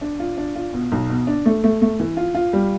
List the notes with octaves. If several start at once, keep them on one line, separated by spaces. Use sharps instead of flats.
D4
F4
D4
F4
B2
B1
B2
D4
A3
A3
A3
E3
F4
F4
G3